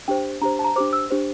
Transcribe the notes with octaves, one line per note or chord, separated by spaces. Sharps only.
D4 G4 C5 G5
D4 G4 C5 A#5
A5
A#5
D4 G4 C5 D6
E6
D4 G4 C5